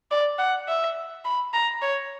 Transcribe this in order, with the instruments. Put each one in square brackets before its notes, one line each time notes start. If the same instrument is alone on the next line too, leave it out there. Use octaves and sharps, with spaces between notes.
[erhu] D5
F#5
E5
B5
A#5
C#5